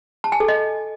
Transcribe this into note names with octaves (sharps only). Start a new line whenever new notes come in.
A5
G#5
A4
D#5